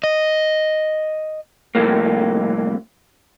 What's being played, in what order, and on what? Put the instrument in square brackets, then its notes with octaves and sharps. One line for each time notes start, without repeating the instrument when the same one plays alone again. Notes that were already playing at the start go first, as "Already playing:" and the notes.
[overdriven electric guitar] D#5
[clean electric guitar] C2 F2 A2 A#3